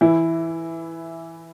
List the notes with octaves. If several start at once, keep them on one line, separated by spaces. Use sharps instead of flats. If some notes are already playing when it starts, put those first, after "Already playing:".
E3 E4